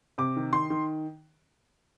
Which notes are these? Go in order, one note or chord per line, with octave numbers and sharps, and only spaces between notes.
C3 D6
D#3
D#3 C6
D#3